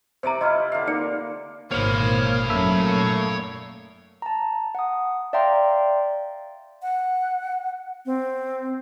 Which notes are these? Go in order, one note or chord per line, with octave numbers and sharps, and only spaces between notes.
C3 C5 D5 A#5 D6
E4 F4 D#5 F6
D3 F5
A#3 D#4 D5 C#7
G#1 A#3 C5 C#5 B5
F#2 A3 A#3 E5
A5 A#5
F#5 D#6
D5 E5 F5 G5 A#5 C6
F#5
C4